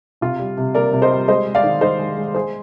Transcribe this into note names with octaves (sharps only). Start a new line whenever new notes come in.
C3 F4
G3
C3
A#3 A#4 D5
C3
C5 D#5
G3
G#3 C5 D#5
G#3
D5 F5
D#3
D#3 C5 D#5
G#3
G#3
G#3 G#4 C5